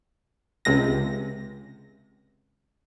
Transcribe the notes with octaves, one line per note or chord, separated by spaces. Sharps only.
C#2 C3 A#6